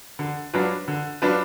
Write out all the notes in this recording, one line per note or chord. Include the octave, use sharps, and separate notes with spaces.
D3
F#3 D4 F4 B4
D3
F#3 D4 F4 B4